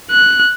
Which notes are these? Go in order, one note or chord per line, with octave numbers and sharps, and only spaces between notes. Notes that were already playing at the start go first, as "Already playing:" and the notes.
F#6